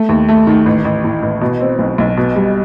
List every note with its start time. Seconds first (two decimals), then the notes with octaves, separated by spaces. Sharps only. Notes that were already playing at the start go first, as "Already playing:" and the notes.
Already playing: A3
0.09 D#2
0.29 A3
0.47 D#3
0.66 A1
0.85 A1
1.04 A2
1.23 A1
1.41 B2
1.60 C4
1.79 B1
1.98 B1
2.17 B2
2.36 G3